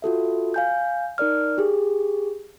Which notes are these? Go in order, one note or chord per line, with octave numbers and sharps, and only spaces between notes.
F4 F#4 A4 E5
F5 G#5 G6
D#4 A#4 D5 F6
G4 G#4